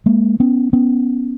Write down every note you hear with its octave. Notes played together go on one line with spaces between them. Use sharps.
G#3 A#3
B3 C#4
B3 C#4